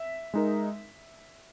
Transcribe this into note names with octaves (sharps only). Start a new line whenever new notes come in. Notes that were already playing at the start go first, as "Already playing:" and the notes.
Already playing: E5
G#3 D#4 A#4